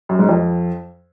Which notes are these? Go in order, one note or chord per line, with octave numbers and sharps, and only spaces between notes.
F#2
G#2
F2